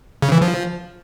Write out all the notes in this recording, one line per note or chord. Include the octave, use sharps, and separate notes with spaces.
C#3
E3
F3